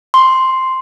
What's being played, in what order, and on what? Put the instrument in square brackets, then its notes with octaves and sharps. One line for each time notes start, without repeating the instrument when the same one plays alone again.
[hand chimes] C6